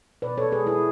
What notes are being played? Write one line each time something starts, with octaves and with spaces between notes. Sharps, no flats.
B2 B4 D5
A4 C#5
G#3 G#4 B4
E4 G#4